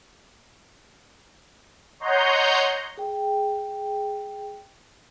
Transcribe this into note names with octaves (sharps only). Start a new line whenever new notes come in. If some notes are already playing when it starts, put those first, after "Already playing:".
C#5 D#5 F#5 A#5 C6 G6
G#4 G5